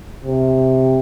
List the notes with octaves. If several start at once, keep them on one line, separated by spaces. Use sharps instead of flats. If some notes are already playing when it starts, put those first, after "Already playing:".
C3